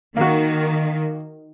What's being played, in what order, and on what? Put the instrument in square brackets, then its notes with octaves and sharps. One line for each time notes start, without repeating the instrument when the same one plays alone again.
[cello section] D#3 [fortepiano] A#3 F#4